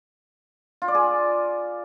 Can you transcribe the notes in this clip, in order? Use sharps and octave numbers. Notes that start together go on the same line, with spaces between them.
F4
D5
G#4